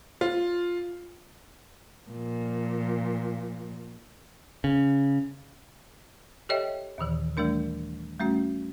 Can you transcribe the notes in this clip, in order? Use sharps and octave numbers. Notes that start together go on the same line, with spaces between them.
F4
A#2 F3
C#3
G4 A4 C#5 D#5 E5 G5
D#2 A#2 D#3 E3
E3 G3 A3 D4 A#4
G3 A3 C#4 F#4